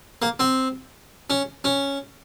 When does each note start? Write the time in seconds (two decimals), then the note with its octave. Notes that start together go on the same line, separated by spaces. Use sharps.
0.22 A#3
0.40 C4
1.30 C#4
1.64 C#4